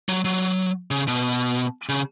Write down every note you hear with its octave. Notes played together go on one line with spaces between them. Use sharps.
F#3
F#3
C#3
B2
C#3